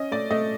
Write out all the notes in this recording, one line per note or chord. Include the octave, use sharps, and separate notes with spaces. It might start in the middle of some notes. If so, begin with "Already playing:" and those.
Already playing: C#4 D#5
A3 D5
A3 D#5